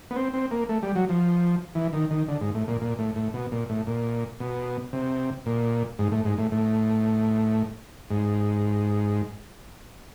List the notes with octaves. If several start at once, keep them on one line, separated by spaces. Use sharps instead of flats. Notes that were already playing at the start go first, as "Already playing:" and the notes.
B3
C4
C4
A#3
A3
G3
F#3
F3
E3
D#3
D#3
D3
G#2
A2
A#2
A#2
A2
A2
B2
A#2
A2
A#2
B2
C3
A#2
G#2
A2
G#2
A2
A2
G#2